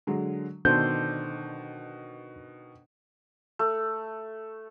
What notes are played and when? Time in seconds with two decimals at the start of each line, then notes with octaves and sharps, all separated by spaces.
0.07 D3 F#3 G#3
0.65 B2 D#3 D4 A4 C5 G6
3.59 A3